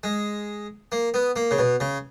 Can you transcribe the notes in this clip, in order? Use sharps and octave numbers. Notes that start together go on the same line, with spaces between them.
G#3
A#3
B3
A#3
C#3
B2
C#3